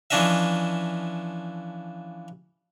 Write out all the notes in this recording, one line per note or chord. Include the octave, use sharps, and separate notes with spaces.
E3 F3 C#4 D4 D#5 E5